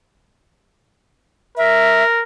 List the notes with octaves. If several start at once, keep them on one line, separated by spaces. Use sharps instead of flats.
A#4 E5